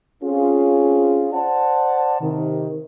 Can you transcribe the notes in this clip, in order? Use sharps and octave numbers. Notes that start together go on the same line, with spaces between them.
C4 C#4 F4 G#4
C5 D5 F#5 A5
C3 D#3